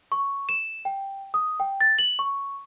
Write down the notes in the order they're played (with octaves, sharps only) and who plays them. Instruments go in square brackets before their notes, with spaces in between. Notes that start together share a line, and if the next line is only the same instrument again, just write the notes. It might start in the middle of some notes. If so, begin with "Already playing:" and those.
[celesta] C#6
E7
G5
D#6
G5
A6
F#7
C#6